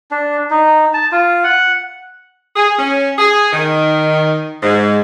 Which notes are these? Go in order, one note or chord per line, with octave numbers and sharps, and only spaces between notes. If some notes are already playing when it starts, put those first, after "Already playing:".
D4
D#4
A5
F4
F#5
G#4
C#4
G#4
D#3
G#2